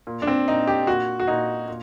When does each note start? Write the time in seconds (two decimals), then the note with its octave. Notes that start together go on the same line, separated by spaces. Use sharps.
0.07 A#2
0.22 D4
0.27 C4
0.48 A#2 D#4
0.67 G4
0.87 A#2 F#4
1.20 F#4
1.27 A#2 D#4
1.68 A#2